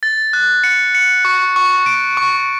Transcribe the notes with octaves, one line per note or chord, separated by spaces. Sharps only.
A6
F#6
C#7
C#7
C#6
C#6
D7
C#6